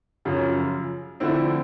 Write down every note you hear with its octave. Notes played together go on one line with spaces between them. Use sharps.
F#2 C#3 F3
D3 F3 A3 C4 E4